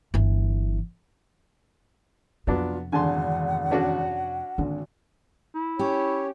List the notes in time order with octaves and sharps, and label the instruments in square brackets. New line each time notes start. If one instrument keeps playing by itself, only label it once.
[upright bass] G1 E3
[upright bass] F2 C3 [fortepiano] F#3 B3 D4 [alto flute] F4
[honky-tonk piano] G#1 E2 D3 [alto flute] F#5 [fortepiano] G#5 A5 C6
[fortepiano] C#4 D4 F#4
[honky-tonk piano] G#1 D3 [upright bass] A#3
[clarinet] E4
[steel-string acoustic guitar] C#4 G4 [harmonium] C#5